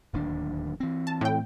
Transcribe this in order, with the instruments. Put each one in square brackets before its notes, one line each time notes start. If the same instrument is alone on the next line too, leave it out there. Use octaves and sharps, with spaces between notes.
[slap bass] D1 D#2 D4
E3 C4
[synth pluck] A5
A2 G5